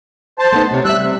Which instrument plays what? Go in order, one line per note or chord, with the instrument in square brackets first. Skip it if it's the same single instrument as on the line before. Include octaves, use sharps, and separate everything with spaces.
[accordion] C5 A5
[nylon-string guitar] A3 B3 D#4
[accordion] C3 [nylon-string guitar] B3 C#5
[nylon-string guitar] G3 E5 [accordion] E6 F#6
[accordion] C3